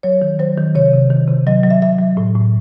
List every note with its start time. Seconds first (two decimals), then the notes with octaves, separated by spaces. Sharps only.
0.03 F#3 C#5
0.22 D#3
0.39 F#3 C5
0.57 D#3
0.75 C3 C#5
0.93 C3
1.10 D#3
1.28 C3
1.47 F#3 D#5
1.64 F#3
1.70 E5
1.82 F#3 E5
1.99 F#3
2.17 A2
2.36 A2